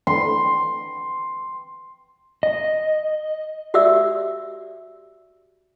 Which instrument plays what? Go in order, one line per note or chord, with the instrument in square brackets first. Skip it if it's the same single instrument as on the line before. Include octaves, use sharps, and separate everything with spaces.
[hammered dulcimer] C6
[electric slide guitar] D#5
[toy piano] F#4 G4 D5 E5 E6